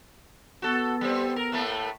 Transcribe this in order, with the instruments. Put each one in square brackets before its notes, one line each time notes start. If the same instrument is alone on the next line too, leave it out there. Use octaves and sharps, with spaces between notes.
[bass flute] B3 [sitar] F#4 A4
[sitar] G3 C4
A#4
A2 A3 A#3